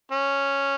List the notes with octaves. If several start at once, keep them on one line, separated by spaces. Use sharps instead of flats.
C#4